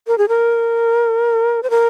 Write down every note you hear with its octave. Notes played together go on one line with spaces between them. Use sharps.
A#4
G#4
A#4
C5
A#4